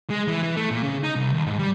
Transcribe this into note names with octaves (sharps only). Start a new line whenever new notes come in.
G#3
E3
E3
A3
A#2
C#3
D#4
C2
D#2
G#2
G3